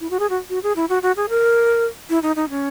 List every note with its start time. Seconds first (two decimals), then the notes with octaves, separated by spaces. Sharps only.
0.01 E4
0.10 F#4
0.20 G#4
0.30 F#4
0.50 F#4
0.63 G#4
0.76 E4
0.89 F#4
1.03 F#4
1.17 G#4
1.29 A#4
2.10 E4
2.23 D#4
2.36 D#4
2.50 C#4